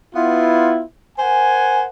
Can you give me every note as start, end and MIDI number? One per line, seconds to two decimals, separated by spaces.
0.15 0.83 59
0.15 0.83 64
0.15 0.83 65
1.19 1.88 70
1.19 1.88 72
1.19 1.88 78
1.19 1.88 80